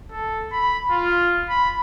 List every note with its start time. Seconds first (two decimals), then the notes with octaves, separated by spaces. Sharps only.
0.11 A4
0.52 B5
0.91 F4
1.49 B5